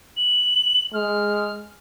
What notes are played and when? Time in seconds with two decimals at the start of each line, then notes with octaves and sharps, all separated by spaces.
0.16 F#7
0.93 G#3 F6